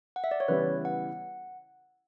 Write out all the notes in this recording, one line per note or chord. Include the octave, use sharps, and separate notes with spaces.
F#5
E5
D5
C#5
C#3 E3 G3 B3 E4 B4
F#5